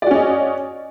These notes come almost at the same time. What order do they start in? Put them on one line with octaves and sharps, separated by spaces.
D5 F#4 C#4 D#5